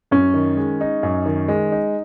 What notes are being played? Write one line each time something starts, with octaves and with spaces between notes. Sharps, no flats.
F#2 C#4
D#3
G#3
D#4
F#2
D#3
G#3
D#4